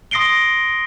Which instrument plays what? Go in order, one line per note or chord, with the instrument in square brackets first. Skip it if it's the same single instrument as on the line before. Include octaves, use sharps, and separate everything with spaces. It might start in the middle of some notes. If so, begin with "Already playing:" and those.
[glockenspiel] C6 D#6 A#6 C7 D7 G7